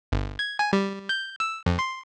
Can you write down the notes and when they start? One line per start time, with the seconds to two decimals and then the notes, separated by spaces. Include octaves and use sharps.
0.12 G1
0.39 G#6
0.59 G#5
0.73 G3
1.09 G6
1.40 E6
1.66 F2
1.79 C6